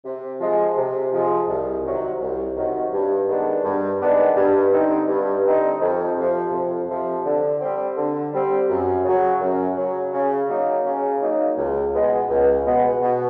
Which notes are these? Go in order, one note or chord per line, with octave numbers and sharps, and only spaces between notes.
C3
F3 G#3
C3
F3 G#3
C2
C3 D#3 F#3
C2
C3 D#3 F#3
G2
D#3 G#3 B3 D4
G2
D#3 G#3 B3 D4
G2
D3 G3 C4 D#4
G2
D3 G3 C4 D#4
F2
C3 F3
F2
C3 F3
D3
G3 C4
D3
G3 C4
F#2
C#3 F#3
F#2
C#3 F#3
C#3
F#3 A#3 D#4
C#3
F#3 A#3 D#4
C#2
B2 G#3 B3
C#2
B2 G#3 B3
B2